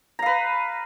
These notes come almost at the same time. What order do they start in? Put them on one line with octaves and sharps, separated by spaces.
A#5 F5 B4